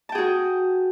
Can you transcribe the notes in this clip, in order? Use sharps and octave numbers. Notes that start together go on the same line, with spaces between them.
F#4 G#4 G5 A5